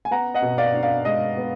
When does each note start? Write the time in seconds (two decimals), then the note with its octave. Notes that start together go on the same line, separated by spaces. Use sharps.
0.05 G#5
0.11 B3 F#5 A#5
0.34 D#5 F#5
0.42 B2
0.58 D5 F5
0.74 D4
0.83 D5 F5
1.05 G#3 D#5
1.37 B3